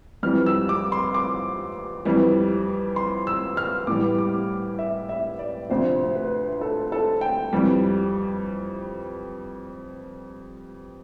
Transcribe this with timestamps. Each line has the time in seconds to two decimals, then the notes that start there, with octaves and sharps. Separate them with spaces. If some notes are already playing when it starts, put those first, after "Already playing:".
0.23 F2 E3 G3 F6
0.46 E6
0.69 D6
0.92 C6
1.15 D6
2.05 F2 E3 G3
2.96 C6
3.27 E6
3.57 F6
3.87 A2 E3 G3 D6
4.18 D6
4.79 E5
5.09 E5
5.39 D5
5.69 D2 C3 F3 C5
6.15 B4
6.61 A4
6.92 A4
7.21 G5
7.53 F2 E3 G3